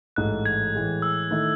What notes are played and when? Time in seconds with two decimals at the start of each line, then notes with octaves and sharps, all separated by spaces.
0.16 A1 G#2 E3 A3 D#4 F#6
0.46 G#6
0.74 A2 E3 G#3
1.02 E6
1.31 D#3 A3 E4